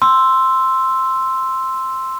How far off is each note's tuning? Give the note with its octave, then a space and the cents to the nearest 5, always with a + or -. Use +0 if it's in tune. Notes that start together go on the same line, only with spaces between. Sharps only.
C6 +0 E6 +0